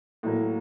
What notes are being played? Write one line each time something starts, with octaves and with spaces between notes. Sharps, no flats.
A2 F#3 A#3